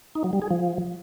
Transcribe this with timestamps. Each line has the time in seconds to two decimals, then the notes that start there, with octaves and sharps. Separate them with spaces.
0.15 D#4
0.24 F#3
0.33 G3
0.42 G#4
0.51 F3